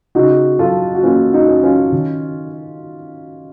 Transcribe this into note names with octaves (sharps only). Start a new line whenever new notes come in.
C#3 D#4 F#4
F#3 F4 A4
F#4
A#3 C#4 F4
D#4 F#4
C#4
C#4 F4
D#3